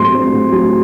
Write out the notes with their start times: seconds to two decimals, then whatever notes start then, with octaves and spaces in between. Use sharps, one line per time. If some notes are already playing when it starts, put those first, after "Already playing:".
Already playing: A2 F#3 C4 C6
0.13 C4
0.32 A2
0.52 F#3